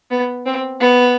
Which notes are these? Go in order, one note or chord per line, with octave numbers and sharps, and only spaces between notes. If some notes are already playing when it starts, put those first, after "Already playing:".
B3
C4
B3